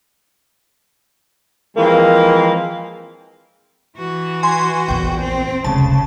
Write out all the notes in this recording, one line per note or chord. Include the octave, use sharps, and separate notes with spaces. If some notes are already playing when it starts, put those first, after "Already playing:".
E3 F3 G#3 A#3 C4
E3 F#4
G#5 C6
A#1 E2 G5
C4
F1 C#2 C#3 A5